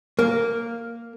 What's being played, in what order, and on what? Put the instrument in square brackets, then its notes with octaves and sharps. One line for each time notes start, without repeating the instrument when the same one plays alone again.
[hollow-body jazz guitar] A#3